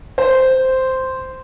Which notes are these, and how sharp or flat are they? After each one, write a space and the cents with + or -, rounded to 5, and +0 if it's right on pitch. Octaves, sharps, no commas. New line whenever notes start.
C5 -5